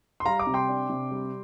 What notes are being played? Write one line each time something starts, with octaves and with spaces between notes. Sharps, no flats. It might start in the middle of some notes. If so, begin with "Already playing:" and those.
C6
G3 F5 A#5
A#5 D6
C3
G5 C6
D4
C3
G3